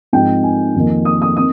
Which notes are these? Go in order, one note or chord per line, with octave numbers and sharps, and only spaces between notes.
G#2 F3 C4 D#4 G5
G#5
F2 D#3 A#3 D#4
D#6
D#6
C4 D#4 D#6